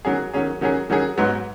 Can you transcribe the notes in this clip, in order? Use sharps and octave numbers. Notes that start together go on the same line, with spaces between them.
D#3 F#3 C#4 G#4
D#3 F#3 C#4 G#4
D#3 F#3 C#4 G#4
D#3 F#3 C#4 G#4
G#2 F#3 B3